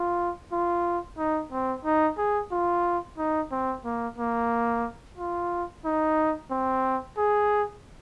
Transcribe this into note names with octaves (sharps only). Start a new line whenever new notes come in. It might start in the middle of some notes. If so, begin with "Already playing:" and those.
Already playing: F4
F4
D#4
C4
D#4
G#4
F4
D#4
C4
A#3
A#3
F4
D#4
C4
G#4